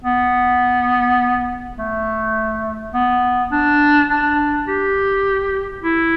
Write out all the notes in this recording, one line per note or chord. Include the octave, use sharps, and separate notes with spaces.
B3
A3
B3
D4
D4
G4
E4